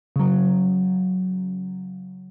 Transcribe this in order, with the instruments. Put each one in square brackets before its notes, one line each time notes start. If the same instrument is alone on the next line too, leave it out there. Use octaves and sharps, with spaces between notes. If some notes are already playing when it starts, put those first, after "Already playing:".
[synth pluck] C#3 F#3